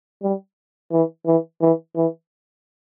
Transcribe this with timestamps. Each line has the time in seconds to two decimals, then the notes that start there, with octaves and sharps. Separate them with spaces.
0.23 G3
0.92 E3
1.26 E3
1.61 E3
1.96 E3